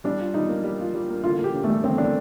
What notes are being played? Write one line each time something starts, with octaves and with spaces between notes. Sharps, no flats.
G3 D4
F4
G3 D#4
A#3
G3
F4
G3
A#3
D3 F4
A#3
G4
D3
A3
G3
D3 C4
A#3 D4